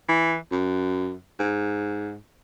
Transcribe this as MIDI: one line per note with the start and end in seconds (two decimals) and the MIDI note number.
0.09 0.36 52
0.52 1.15 42
1.40 2.16 44